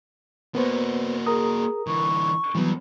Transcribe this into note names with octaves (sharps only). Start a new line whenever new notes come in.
A#3 B3 F#4 B4 C5
G#4 A#4 A#5 D#6
D3 E3 C#6
E3 F#3 G3 B3 C4